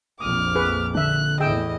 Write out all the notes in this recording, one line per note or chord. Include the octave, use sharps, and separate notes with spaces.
A#1 F2 D6 D#6 F6
G#4 B4
D3 D4 E5 F#6
E2 A2 E4 G#4 D#5 G5 E6